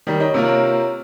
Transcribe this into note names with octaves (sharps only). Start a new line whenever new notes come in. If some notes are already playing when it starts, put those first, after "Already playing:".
D#3 G3
D#4 C#5
C3 A#3 F4 B4
C#5 A#5